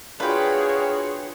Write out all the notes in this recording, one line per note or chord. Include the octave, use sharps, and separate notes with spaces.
D4 F4 F#4 G#4 B4 C#5 G5